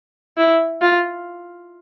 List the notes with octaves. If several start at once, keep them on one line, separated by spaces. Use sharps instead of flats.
E4
F4